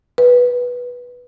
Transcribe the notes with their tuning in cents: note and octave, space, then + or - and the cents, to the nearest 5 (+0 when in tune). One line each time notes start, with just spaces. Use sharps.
B4 -10 D#5 -45